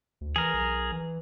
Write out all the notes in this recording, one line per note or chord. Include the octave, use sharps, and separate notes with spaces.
D2
E3 G#4 A#4
B1
E3